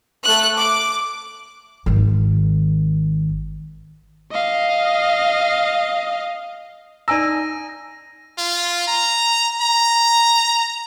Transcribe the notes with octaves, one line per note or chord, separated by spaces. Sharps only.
A3 F#6
D6
G#1 D#3
D#5 F5
D#4 D5 G#5 A#5 E6 A#6 D#7
F4
A#5
A#5